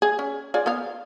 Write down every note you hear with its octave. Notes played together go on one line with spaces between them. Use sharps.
G#4
C#4
F4 G#4 D5
B3 F4 F5